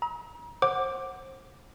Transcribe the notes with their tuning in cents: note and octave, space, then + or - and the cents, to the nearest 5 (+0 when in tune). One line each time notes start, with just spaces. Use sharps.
A#5 +40 E6 -45
C5 +30 F#5 +0 D6 +0